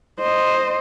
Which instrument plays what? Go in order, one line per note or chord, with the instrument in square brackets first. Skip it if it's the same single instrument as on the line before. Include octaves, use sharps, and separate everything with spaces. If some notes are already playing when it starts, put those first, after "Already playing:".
[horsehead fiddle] C5 D#5